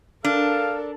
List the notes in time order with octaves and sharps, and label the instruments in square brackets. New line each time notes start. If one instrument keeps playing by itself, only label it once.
[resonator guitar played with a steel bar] D4 [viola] A4 A#4 [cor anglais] F5